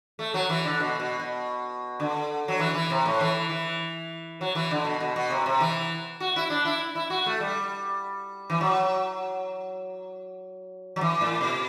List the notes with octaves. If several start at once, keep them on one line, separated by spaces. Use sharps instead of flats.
A3
F#3
E3
D3
B2
B2
B2
D3
F#3
E3
E3
C3
A2
E3
E3
F#3
E3
D3
B2
B2
B2
C3
C3
E3
F#4
E4
D4
E4
E4
F#4
A3
G3
E3
F#3
F#3
E3
A2
B2